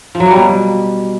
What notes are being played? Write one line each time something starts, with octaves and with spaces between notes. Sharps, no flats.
F3
F#3
A#3
G3
B2